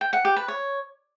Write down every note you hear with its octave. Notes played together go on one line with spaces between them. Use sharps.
G5
F#5
G4
B4
C#5